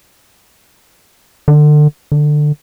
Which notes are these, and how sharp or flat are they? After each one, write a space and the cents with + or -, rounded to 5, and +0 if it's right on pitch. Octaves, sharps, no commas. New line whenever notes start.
D3 +30
D3 +20